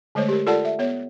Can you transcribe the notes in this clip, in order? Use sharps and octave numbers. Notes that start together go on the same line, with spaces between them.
D3 G#3 A3 C5 C#5
G4 A#4
F4 A4 A#4 D5 F#5 A5
E5
B3 C#5